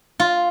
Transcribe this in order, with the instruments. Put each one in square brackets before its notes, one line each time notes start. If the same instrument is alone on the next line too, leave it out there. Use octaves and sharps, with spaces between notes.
[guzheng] F4